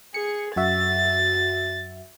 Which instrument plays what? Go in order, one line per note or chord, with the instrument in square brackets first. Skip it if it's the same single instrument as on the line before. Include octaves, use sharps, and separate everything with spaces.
[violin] G#4 [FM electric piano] C#7
[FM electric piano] F#2 F#4 E5 [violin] A6